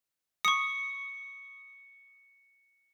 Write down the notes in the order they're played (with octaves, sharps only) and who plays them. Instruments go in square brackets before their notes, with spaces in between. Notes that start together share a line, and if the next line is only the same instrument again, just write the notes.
[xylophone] C#6 D#6 [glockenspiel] C#7